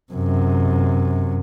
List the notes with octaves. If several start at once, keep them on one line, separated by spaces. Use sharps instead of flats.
F#2 C3